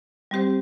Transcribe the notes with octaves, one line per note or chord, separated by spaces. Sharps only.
G3 C4 G4 C5